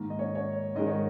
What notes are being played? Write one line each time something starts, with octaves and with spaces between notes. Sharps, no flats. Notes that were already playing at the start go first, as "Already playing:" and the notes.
Already playing: G#2 D#3 A#3
D#5
C#5
C#5
G#2 D#3 G#3 D#5
C#5